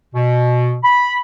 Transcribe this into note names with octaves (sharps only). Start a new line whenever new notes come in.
B2
B5